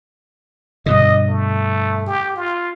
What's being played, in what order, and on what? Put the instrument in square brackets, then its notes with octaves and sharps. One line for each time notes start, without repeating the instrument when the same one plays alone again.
[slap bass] G2 B2 D3 [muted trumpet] D#5
[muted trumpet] A3
G4
F4